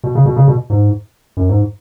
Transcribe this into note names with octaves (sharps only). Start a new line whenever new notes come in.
B2
C#3
B2
C#3
B2
G#2
F#2
G#2